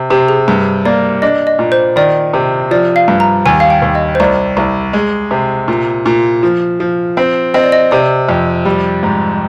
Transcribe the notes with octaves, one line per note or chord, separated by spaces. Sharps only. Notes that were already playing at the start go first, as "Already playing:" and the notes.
Already playing: C3
C3 G4
G#4
G2
A#3 D5
D4 D#5
D#5
A#2
C5
D#3 D5
C3
F3 D5
F5
G2
A#5
D#2 G#5
F5
G5
D#2
D#5
C5
C2 D5
C2
G#3
C3
A#2
A#2
F3
F3
C4 C5
C4 D#5
D5
D#5
C3 D5
F2
G3
G#2